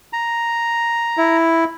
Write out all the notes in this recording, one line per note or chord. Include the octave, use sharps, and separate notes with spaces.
A#5
E4